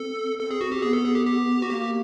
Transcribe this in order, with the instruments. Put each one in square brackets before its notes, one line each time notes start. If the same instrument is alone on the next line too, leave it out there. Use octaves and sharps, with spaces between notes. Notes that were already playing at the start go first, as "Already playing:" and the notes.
Already playing: [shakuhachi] C4 [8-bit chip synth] A4
[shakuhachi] C4 [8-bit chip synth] A4
[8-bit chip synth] G#4
F#4
G4
[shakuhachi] B3 [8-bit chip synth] G#4
[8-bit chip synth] A4
G#4
G4
G4
F#4
[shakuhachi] A#3 [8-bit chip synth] G4